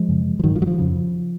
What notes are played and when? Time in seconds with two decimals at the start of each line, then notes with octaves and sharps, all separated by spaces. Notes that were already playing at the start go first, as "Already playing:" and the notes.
Already playing: F3 G#3
0.09 F#2 C#3
0.39 F3
0.44 G#2 D#3 F#3
0.56 F3
0.62 F#3
0.67 F3
0.79 F2 C#3